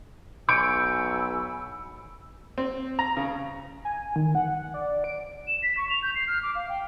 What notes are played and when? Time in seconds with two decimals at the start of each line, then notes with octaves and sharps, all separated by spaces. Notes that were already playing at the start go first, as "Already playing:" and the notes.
0.49 B1 G#5 B5 C#6 E6 G6 D7
2.58 C4
2.99 A#5
3.17 C#3
3.85 G#5
4.16 D#3
4.35 F#5
4.74 D5
5.04 D7
5.48 E7
5.63 B6
5.77 C#6
5.89 F7
6.03 G6
6.15 C7
6.27 F6
6.43 D6
6.55 F5
6.69 G5